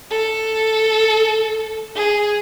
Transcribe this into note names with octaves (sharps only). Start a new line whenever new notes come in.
A4
G#4